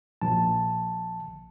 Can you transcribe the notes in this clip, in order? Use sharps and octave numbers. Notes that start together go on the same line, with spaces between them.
A#1 A5